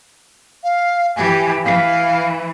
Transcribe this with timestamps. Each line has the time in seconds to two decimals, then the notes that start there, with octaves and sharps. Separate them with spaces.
0.63 F5
1.16 E3 G4 G#5
1.65 E3 F5